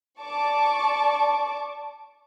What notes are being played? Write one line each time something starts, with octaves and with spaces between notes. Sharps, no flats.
D5 A5 C#6 D6